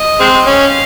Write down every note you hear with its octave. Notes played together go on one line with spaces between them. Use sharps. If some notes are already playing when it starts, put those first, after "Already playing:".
Already playing: D#5
G#3 C4
C#4 F5